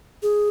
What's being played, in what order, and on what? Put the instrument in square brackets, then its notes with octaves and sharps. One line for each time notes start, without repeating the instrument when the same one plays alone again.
[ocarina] G#4